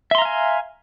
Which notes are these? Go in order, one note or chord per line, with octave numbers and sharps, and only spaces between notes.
E5 F5 G#5 A#5 C6